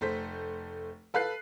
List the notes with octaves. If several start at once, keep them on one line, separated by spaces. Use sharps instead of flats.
F1 A3 C5 B6
A4 B4 F5 F#6 C7